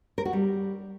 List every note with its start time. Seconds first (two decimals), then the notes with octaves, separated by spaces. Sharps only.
0.18 A#4
0.25 F#4
0.33 G3